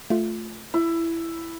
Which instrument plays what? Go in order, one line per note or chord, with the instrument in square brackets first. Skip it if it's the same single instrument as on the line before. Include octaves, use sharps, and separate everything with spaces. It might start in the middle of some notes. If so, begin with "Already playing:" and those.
[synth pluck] A3 F4
[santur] E4